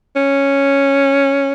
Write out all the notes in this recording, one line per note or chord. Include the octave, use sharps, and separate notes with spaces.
C#4